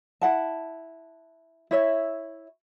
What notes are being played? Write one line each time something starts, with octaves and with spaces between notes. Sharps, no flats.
E4 F#5 A5
E4 C#5 E5